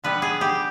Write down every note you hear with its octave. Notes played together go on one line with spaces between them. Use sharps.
D3 G3 B3 B4
G#4
G4